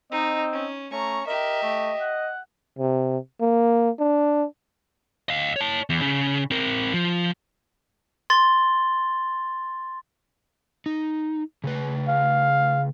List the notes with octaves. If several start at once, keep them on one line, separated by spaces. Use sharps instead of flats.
C4 D#4 D#5
C#4
A3 C#4 A#5 C#6
G4 A#4 D#5 E5
A3
F#5
C3
A#3
D4
D#5 F5
C#5 A5
E2
C#3
C4 A#4
F3
C6 A6 G7
D#4
C#3 A3 B4
F5